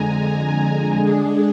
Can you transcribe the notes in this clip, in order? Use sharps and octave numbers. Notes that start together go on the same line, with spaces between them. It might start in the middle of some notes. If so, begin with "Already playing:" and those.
Already playing: F2 D3 G#3 G#5 A#5
D3 G#3 D4 G#4